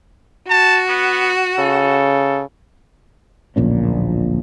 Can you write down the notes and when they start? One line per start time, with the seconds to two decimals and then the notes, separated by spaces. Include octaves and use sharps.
0.50 F#4 A5
0.89 B3
1.59 C#3 A4
3.56 D1 A#1 A#2 C#4